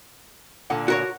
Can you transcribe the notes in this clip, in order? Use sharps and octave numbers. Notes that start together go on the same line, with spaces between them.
A#2 D3 F#5
F#4 A#4 C#5